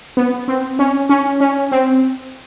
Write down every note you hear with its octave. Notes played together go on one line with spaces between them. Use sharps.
B3
C4
C#4
C#4
C#4
C4